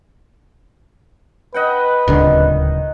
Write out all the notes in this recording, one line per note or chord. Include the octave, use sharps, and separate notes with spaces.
B4 D#5 F#5 G5
D1 C#2 D3 D#3